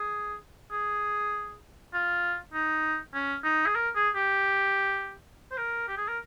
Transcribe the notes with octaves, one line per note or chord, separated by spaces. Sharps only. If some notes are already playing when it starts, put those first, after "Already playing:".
Already playing: G#4
G#4
F4
D#4
C#4
D#4
G#4
A#4
G#4
G4
C5
A#4
G4
G#4
A#4